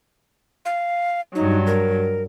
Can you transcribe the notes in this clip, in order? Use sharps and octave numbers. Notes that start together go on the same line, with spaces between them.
F5
G2 F#3 D#4
A#4